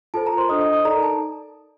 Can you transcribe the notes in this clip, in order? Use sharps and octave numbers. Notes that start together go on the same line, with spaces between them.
F4 A4 C5 A5
A#4 A#5
C5 C6
D4 A4 C5 D#5 D#6
D#5 D#6
D#5 D#6
D#4 A4 A#4 D5 A#5
A5